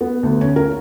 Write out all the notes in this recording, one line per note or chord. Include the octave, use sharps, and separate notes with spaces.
B3
D2
C#4
A#4